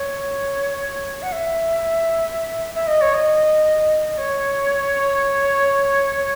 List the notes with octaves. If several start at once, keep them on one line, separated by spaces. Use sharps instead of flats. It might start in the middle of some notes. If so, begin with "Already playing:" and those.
Already playing: C#5
F#5
E5
E5
D#5
C#5
D#5
C#5